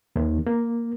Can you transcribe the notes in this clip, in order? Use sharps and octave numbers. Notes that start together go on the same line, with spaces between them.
D#2
A#3